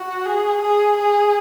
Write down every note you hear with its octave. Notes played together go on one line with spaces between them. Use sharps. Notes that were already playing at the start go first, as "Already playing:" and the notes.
Already playing: F#4
G#4
G#4
G#4